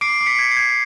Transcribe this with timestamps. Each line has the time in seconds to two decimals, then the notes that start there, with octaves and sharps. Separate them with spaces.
0.01 D6 C7 D7
0.21 D6
0.26 B6 C#7
0.39 G#6
0.51 C7
0.57 G#6